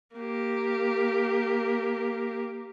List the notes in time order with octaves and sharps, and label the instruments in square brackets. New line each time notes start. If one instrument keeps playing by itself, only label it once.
[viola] A#3 G4